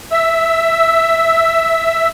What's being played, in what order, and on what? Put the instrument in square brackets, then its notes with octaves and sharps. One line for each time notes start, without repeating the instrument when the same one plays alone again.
[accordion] E5 E6